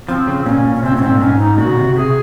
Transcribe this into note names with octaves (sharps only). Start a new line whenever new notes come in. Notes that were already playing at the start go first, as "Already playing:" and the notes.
F3 C4
C#3
A#2 C#4
A#2
C#4
C3 C4
A#2
C#4
G#2 C4
A#2
G#2 C#4
D#4
A#2 F#4
C#3
C3
C3 G#4